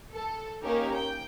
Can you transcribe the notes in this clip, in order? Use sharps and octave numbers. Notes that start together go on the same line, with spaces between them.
A4
A#3 C#4 D#4 G4 A#4
G5